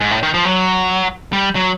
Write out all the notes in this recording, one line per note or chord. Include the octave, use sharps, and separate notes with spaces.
G#2
A2
D#3
F3
F#3
G3
F#3